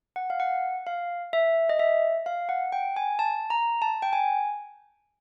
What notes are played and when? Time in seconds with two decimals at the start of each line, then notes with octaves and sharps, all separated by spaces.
0.16 F#5
0.30 F5
0.40 F#5
0.87 F5
1.33 E5
1.69 D#5
1.79 E5
2.26 F5
2.49 F#5
2.72 G5
2.96 G#5
3.19 A5
3.50 A#5
3.82 A5
4.02 G5
4.13 G#5